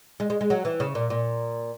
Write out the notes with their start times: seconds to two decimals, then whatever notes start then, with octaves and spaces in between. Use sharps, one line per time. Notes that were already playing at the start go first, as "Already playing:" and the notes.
0.20 G#3
0.30 G#3
0.41 G#3
0.50 F#3
0.65 E3
0.80 C#3
0.95 A#2
1.10 A#2